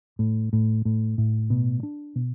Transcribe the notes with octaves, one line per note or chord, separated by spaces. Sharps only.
A2
A2
A2
A2
B2
D4
B2